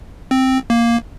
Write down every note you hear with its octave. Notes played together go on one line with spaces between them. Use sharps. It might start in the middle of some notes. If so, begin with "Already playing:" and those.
C4
A#3